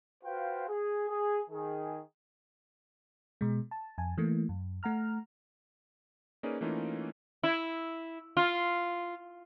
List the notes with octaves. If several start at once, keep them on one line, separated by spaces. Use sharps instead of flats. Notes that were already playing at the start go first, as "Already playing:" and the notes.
F4 F#4 B4 C5 F5 G5
G#4
G#4
D#3 G#4
B2 G#3
A5
F2 G#5 A5
E3 A3 A#3
F#2
A3 F#5 A#5 F6
A#3 C#4 D#4 G#4 B4 D5
E3 A3 A#3 C#4 D#4 F4
E4
F4